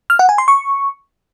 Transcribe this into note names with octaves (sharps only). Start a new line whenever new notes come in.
F6
F#5
G#5
C6
C#6